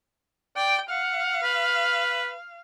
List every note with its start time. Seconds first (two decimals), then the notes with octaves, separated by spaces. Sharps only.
0.56 D5 G5
0.90 F5 F#5
1.43 B4